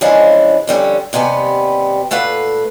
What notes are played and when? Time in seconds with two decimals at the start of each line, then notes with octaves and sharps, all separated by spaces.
0.01 C#3 E3 F3 G#3 C#4 D4
0.67 F2 D3 G3 C#4
1.13 D#2 C3 G3 B3 G#5
2.11 A#2 A3 B4 F5 F#5